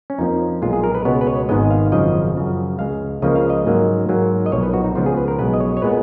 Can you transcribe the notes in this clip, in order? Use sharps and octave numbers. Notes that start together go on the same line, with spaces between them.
C#4
F2 F3 A#3 D#4
B1 A#2 G#3 F4
G#4
A#4
B4
C#2 B2 G#3 B3 C#5
B4
C#5
G#1 G#2 D#3 G#3 B3 D#5
F5
G#1 F#2 C#3 F3 D#5
F#2 C#3 F3
C#2 C#3 G#3 F5
C#2 C#3 F3 A#3 D#5
F5
D#5
G#2 F#3 A#3
G#2 F#3 A#3
D#5
B1 A#2 F3 C#5
B4
F#4
D#4
C#2 C#3 F3 B3 F4
G#4
B4
A#4
B1 B2 G#3 B3 B4
D#5
C#5
C#5
A#2 G#3 B3 B4